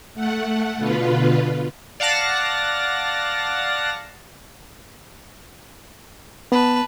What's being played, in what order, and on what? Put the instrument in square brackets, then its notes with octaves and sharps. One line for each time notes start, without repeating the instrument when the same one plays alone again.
[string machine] A3 F#5
B2 D3 F4 B4
[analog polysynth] D5 F5 F#5 A5 A#6
[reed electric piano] B3 [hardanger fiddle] B4 A5